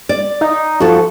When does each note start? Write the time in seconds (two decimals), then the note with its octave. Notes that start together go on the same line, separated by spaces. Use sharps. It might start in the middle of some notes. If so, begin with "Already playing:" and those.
0.09 D5
0.41 D#4
0.80 F3 F#4 A4